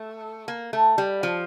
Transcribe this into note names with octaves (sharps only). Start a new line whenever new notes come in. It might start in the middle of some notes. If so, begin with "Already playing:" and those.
Already playing: A3
A#3
A3
G3
F3